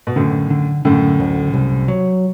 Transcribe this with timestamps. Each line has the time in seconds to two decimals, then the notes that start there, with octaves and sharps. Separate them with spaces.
0.07 B2
0.16 F#2 A2 D3
0.50 D3
0.85 F#2 A2 D3
1.20 D2
1.54 C2
1.88 F#3